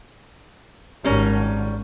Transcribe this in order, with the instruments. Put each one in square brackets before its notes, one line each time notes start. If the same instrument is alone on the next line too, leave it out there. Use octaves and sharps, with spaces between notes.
[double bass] G#1 [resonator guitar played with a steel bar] G3 C#4 A#4